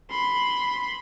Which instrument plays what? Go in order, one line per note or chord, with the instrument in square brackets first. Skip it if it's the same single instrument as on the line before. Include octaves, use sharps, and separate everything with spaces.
[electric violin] B5 C6